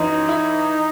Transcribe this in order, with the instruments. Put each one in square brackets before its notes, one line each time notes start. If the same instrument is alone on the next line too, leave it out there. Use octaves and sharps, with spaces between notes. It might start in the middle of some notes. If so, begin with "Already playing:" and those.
Already playing: [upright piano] F#2 E3 [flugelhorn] D#4
[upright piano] E4